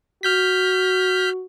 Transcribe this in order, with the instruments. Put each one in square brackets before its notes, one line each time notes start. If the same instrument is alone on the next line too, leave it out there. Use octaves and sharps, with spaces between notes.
[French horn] F#4 [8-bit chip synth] F6 G6 B6